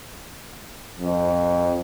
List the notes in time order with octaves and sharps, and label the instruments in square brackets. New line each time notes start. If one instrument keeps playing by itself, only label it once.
[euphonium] F2